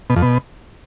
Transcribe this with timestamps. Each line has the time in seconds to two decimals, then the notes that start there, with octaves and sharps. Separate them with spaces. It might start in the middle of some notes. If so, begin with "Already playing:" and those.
0.10 B2
0.16 F2
0.22 B2